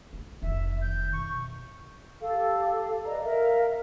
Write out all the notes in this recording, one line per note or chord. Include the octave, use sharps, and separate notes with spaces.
G#3
F1 D#3 E5
G6
B2 C#6
G4 A4 F5
B4 D5 D#5 A#5
A#4 E5 F5 A#5